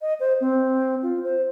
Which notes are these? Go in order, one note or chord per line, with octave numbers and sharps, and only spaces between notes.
D#5
C5
C4
F4
C5